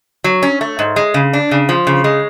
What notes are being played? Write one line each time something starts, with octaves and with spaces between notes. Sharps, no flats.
F#3
C#4
A3
G#2
G#3
C#3
D4
C#3
F3
C#3
G#3